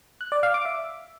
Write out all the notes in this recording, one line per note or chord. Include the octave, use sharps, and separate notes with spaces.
F#6
D5
F5
D6
E5